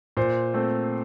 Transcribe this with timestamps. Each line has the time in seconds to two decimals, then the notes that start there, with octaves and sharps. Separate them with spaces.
0.17 A#2 C5
0.54 A3 C4